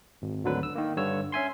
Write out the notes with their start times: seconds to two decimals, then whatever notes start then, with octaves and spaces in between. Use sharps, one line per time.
0.22 G#1
0.44 G#1 D2 D3 F#3 B4
0.63 E6
0.75 D#3 A#3
0.97 G2 D3 C#5 E6
1.32 C#4 E5 G#5 C6